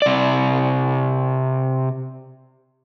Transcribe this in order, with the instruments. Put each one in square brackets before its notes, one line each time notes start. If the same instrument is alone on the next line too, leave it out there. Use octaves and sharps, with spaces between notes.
[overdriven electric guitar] C3 D5